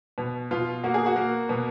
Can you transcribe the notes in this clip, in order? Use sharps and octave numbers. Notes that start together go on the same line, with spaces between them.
B2
B2 F4
A#3 F#4
G#4
F#4
A#3
B2